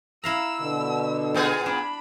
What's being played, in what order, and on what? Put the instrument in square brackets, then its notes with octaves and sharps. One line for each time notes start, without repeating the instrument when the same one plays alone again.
[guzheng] E4 F5 A#5 [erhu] E6
[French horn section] B2 D3
[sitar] A#2 B3 G#4
[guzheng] D4 [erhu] B5